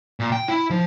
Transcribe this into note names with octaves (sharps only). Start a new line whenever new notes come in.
A#2
G5
E4
F3